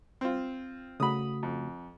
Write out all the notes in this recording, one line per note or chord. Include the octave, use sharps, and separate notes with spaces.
C4 F4
C#3 A3 F#4 B5 D#6
F2